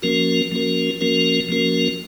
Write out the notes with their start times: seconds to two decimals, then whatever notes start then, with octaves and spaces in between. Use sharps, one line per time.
0.02 F3 A#3 C#4 F#4 A#4
0.51 F3 A#3 C#4 F#4 A#4
1.01 F3 A#3 C#4 F#4 A#4
1.49 F3 A#3 C#4 F#4 A#4